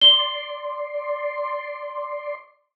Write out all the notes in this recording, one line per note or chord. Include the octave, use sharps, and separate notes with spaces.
D5 C6 G7